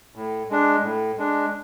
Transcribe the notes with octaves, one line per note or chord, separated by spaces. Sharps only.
A2
G#3 D4
A2
G#3 D4